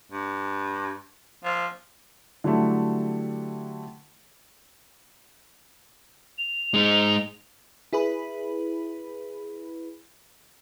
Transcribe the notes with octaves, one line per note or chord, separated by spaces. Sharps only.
G2
F3
D3 F#3 G3 A3 E4
F7
G#3 D#4
E4 G#4 B4 B5